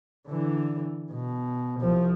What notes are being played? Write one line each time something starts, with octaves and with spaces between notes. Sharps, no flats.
D3 E3
B2
C2 F3